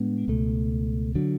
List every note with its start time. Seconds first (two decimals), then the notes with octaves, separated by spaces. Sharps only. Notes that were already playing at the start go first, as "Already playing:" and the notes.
Already playing: A2 G#3 B3 D4
0.28 C#2 B2 A3
1.15 D3 F#3